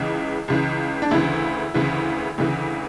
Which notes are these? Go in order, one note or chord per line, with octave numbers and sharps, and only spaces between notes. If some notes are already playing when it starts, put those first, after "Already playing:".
Already playing: C#2 C#3 E3
C#2 C#3 E3
D4
D2 C#3 E3 E4
D2 C#3 E3
D2 C#3 E3